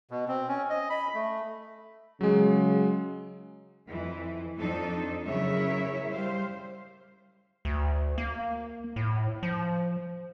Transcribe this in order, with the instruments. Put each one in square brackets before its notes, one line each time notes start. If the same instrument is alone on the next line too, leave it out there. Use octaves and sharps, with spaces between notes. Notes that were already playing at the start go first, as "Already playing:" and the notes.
[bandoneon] B2
C4
C#4
D#5
B5
A3
[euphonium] C#3 [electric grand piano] F#3 G#3
[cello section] F2 E3
F2 F3 D4 D#4 A4
F#2 C#3 E4 A#4 C#5 E5
G3 C5 F5
[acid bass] D2
A#3
A2
F3